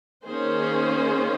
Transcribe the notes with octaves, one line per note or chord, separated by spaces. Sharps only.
D#3 A#3 C#4 G#4 C5